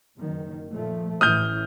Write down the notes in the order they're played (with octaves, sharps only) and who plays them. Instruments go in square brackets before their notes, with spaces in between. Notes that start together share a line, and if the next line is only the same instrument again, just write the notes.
[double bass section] F#1 D#3
A#2 F3 A3
[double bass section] A1 A2 E3 [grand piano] D#6 F6 G6